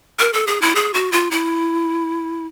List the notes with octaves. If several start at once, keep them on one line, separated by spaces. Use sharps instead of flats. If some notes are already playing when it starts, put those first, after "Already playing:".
A#4
A4
G#4
E4
G#4
F#4
F4
E4